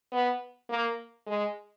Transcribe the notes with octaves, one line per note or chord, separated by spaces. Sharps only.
B3
A#3
G#3